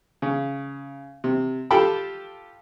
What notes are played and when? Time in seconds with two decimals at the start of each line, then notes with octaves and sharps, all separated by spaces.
0.22 C#3
1.24 C3
1.71 F4 G4 A4 G5 A5 B5